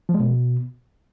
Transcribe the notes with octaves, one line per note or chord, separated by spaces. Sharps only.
F3
G#3
B2